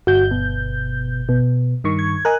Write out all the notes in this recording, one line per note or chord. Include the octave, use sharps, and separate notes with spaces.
G1 F#4 G6
B2
B2
G2 D#3 C#6
G#6
A#4 D#5 G#5 F#6